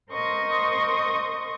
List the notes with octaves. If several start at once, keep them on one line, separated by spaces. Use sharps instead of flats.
A#4 C5 D#5 C6 C#6 D#6